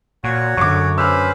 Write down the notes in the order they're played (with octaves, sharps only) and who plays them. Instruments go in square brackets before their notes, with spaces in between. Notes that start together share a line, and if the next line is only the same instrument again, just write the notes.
[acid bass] A#2 [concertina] F#4 C#5
[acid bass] F#2 [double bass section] D3 [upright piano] C#6 D6
[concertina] C#4 B4 C5 [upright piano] E6 F6